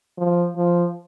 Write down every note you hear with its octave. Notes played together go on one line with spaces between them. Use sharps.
F3
F3